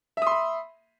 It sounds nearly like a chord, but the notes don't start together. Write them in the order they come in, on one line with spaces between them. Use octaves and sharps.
E5 D#6 C6 B5